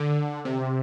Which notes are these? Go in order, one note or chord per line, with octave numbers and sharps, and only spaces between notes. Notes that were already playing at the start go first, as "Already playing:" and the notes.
Already playing: D3
C3